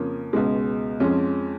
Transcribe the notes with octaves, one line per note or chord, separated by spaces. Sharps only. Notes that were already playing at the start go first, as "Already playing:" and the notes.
Already playing: F2 C#3 F3 A#3 C#4
C#2 B2 G#3
F2 F3 G#3 C#4